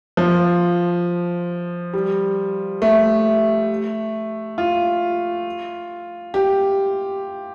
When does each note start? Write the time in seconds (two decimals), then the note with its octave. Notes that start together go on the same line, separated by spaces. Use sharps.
0.17 F3
1.94 G3
2.82 A3
4.58 F4
6.34 G4